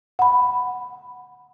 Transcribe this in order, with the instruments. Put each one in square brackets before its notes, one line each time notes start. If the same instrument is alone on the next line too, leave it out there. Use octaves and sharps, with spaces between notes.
[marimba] F#5 B5